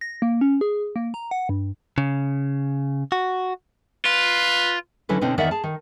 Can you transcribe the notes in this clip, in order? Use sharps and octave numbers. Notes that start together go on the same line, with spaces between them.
A#6
A#3
C#4
G#4
A#3
A#5
F#5
G2
C#3
F#4
F4 B4
D3 F#3 C#4 E4 A4 B4
B2 D3 C4 C#4 D#4
E2 D#3 A#4 D5 E5 F#5
G#4 A5
D#3